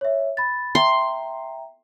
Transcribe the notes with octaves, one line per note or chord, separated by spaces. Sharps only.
C#5 E5
B5 A6
E5 G5 A#5 C6